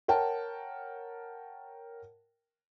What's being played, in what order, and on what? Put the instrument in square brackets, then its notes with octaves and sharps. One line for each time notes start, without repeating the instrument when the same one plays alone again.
[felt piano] A#4 C#5 F#5 G5 A5